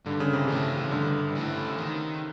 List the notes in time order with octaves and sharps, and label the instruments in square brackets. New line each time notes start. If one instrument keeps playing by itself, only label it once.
[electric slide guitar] G2 [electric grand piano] D3
[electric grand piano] C#3
C3
[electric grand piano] C#3 [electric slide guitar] E3 A3
[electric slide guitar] G2 [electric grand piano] D3
[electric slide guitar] E3 A3
D#3